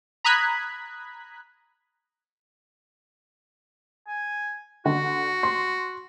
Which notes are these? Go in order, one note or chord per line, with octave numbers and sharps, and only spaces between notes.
A#5 B5 D#6 F#6 G#6 B6
G#5
D3 F#4
C6